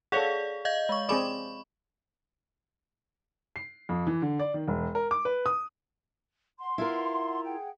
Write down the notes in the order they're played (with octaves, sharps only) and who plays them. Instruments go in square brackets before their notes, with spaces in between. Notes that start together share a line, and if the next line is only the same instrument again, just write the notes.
[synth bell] G#4 D5 F5 [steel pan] A4 C#5 F#5
[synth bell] D#5 F5 G6
G#3 C#6
[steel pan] C4 G#4 D5 [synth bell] B5 C#6
[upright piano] C7
F2
E3
D3
D5
D#3
E1
A#4
D6
B4
D#6
[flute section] F#5 C6
[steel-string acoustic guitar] E4 F4 A#4
[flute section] G#4 F#5 G5